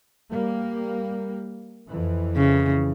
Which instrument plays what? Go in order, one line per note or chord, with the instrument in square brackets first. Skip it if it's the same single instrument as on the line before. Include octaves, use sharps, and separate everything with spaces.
[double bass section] G3 A#3
F2 E3
[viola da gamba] C#3